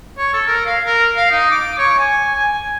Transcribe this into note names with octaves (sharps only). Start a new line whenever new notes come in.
C#5
A4
A#4
F5
A#4
F5
D#4
D6
C#5
G#5
G#5